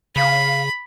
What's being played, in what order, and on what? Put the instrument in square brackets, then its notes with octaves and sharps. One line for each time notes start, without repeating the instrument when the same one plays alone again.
[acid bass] C#3 [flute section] F5 [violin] B5